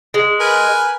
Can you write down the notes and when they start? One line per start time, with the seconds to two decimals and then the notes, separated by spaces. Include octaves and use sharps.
0.14 G#3
0.40 A#4 B4 G#5